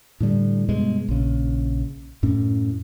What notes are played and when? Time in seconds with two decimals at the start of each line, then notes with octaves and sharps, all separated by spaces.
0.20 A2 D3 G3
0.69 G2 B2 G#3
1.08 A#1 C#3
2.23 F#2 A2 C#4